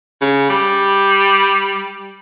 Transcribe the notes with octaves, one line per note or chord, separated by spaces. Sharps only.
C#3
G3